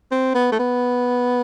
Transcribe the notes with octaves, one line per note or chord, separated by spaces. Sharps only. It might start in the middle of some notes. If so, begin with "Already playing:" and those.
C4
B3
A3
B3